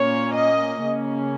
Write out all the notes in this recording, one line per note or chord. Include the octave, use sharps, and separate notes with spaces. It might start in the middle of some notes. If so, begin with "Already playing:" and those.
Already playing: A#2 A#3 C#4 C#5
D#5
C#3 A#3 C#4